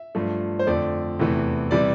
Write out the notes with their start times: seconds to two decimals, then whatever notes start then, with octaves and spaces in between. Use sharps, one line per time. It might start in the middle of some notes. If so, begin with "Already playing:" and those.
Already playing: E5
0.15 G2 F3 A3
0.59 C5
0.67 F2 D3 A3 D5
1.19 E2 C3 E3 A3
1.71 C3 E3 G3 D5